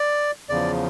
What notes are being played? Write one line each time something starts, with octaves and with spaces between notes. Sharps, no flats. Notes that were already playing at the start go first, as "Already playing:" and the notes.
Already playing: D5
E2 C#3 F3 D5